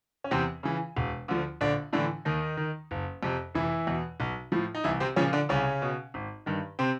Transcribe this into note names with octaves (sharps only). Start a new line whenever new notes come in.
C#4
E2 C3 C4
C#3 E3
E1
D2 D3 F3
A#1 D3 D4
A2 D3 E3 D4
D#2 D#3 D#4
D#3
F#1
F2 C3
F1 E3 E4
E2 B2
B1
A2 F3
D#4
C2 E3 E4
C3 C4
A#2 C#3 F3 C#4
D3 D4
C2 C#3 C#4
B2
G#1
G2 D#3
C3 C4